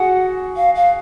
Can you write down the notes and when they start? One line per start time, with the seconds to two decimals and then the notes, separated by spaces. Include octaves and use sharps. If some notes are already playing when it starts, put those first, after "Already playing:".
Already playing: F#4 G#4 F#5
0.56 F5
0.75 F5